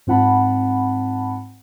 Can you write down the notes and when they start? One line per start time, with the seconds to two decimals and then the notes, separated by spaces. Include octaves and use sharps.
0.07 G#2 C4 F4 F#5 A5 B5